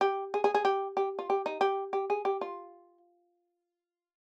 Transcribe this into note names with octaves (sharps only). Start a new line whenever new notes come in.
G4
G#4
G#4
G#4
G4
G4
F4
G4
D#4
G4
G4
G#4
G4
F4